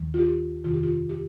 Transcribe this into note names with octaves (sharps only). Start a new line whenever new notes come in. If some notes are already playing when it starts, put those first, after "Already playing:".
Already playing: D#2 D#3
F4
G4
F2 C3 D#3 F4
G4
F4
G4